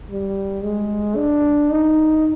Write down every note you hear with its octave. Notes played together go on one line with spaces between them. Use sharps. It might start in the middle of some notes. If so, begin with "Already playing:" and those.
G3
G#3
D4
D#4